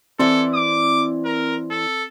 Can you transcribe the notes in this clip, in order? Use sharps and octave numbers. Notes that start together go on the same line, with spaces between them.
E3 C4 E4 A4 D5
D6
A#4
A4